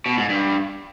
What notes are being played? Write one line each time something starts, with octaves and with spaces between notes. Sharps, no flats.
B2
G#2
G2